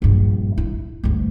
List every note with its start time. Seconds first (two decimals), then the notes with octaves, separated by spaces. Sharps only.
0.02 A#1 G2
0.58 E4
1.04 D2 G2